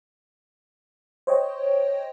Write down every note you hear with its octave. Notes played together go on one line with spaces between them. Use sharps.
C5 C#5 D#5 G5